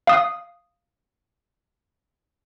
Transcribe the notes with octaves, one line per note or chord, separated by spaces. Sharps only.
F5 D#6